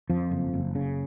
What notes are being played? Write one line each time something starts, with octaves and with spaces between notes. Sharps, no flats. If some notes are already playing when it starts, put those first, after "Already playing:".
F2 F3
F#1
F#1
C#3